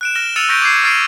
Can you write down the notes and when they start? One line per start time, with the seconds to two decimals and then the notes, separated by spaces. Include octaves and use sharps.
0.01 F#6 D7 E7
0.15 F6 A#6 E7 G7
0.36 E6 F6 A6 C#7 D#7 F7
0.49 C#6 G6 A#6 B6 D7 D#7
0.62 D6 G#6 C7
0.83 C#6 F6 A6 C7 D7 D#7